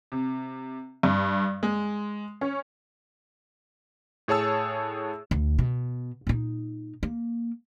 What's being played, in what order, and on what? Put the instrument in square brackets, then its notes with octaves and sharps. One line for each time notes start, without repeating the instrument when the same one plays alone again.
[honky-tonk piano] C3
G2
G#3
C#4
[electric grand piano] A2 G#4 C#5 A5 E6
[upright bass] D2
B2
A#2 D#4
A#3